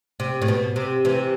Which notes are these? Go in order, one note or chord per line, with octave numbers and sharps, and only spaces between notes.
C3
A2
B2
C3
C3 E3